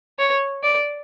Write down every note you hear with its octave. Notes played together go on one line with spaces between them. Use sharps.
C#5
D5